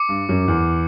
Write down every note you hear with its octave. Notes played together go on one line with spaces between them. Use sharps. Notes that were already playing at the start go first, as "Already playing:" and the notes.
Already playing: D6 C#7
G2
F#2
E2